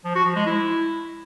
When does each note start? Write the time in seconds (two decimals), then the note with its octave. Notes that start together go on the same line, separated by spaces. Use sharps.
0.05 F3
0.15 F#4
0.25 F3
0.36 G#3
0.46 E4